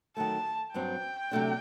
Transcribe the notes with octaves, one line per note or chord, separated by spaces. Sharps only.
D#3 F#3 A3 A5
G2 F#3 C4 G5
C3 F#3 A3 D4